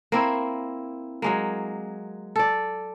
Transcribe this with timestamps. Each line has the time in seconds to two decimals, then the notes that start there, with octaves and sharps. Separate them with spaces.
0.12 A#3 C4 E4
1.22 F#3 G#3 A#3
2.36 A4 D5